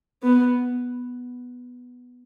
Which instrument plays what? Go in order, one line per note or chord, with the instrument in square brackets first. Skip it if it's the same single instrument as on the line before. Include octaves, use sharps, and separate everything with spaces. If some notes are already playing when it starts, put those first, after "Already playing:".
[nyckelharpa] B3